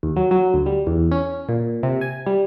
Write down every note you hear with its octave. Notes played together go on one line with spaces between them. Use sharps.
D#2
F#3
F#3
D2
G3
E2
C#4
A#2
C3
G#5
G3